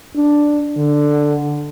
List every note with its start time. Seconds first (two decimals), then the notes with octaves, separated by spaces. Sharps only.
0.16 D4
0.77 D3